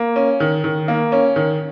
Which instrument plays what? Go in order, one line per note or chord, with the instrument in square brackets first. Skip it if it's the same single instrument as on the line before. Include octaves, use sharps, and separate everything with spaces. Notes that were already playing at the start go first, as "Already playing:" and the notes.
Already playing: [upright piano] A#3
C#4
D#3
D#3
A#3
C#4
D#3